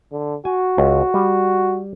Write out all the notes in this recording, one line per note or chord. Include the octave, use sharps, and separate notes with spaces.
D3
F#4 G#5
C#2
G3